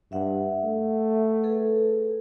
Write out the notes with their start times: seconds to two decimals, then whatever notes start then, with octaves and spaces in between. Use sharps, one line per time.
0.12 G2 E5 F#5
0.65 A3
1.43 G#4 A4 B4